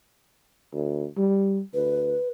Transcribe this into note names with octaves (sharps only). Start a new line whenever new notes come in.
D2
G3
D2 B4